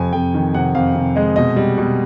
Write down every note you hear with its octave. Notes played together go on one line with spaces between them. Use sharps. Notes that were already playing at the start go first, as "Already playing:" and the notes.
Already playing: F2 C3 G#5
F2 G5
D#3
C3 F#5
F2 F5
C3
G#3 D#5
B2 D#5
G3
B2